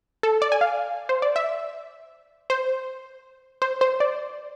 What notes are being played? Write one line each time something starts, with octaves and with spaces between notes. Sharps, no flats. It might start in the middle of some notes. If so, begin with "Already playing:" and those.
A4
D5
G#5
F5
C5
D5
E5
C5
C5
C5
D5